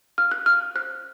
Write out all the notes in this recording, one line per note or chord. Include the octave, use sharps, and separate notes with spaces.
F5 F6
F#6
F5 F6
C5 F#6